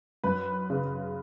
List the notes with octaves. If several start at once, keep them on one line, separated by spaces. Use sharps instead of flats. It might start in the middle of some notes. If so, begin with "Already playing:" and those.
F#2 B4
C#3